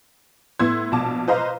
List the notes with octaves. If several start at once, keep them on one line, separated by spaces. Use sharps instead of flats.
A2 B3 E4 C6 E6 G#6
A#1 B2 A5 D6
B4 C5 D#5 F5 A#5